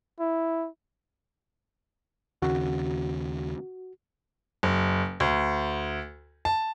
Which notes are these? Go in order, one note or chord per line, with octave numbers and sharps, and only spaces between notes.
E4
D#2 C#3 F#4
F#1
D2
A5